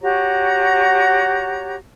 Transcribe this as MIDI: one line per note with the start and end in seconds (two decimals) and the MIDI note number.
0.01 1.75 66
0.01 1.75 67
0.01 1.75 73
0.01 1.75 82